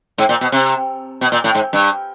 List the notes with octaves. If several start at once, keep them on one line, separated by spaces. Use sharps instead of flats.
G#2
A#2
B2
C3
B2
A#2
A2
G#2
G2